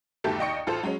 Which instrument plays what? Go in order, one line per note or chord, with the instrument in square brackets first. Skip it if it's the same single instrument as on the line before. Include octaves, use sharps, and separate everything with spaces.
[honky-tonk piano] G1 D#2 A3 G4 A4
D#2 D5 D#5 G5 C#6 C#7
A1 F4 A4 C5 A5
F#3 G#3 C#4